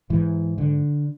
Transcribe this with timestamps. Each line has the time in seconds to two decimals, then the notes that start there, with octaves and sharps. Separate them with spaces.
0.10 G#2 E3
0.58 D3